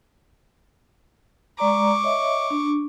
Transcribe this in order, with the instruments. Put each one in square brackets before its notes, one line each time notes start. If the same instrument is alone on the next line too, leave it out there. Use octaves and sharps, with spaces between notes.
[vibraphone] G#3 D5 A#5 [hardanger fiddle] C#6 D6
[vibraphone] C#5 D#5 E5
D4